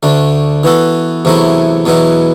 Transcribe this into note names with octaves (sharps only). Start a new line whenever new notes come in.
D2 D3 A3 D4
E3 B3 F#4 A4
E2 C3 F#3 A3 E4
E2 B2 F#3 B3 E4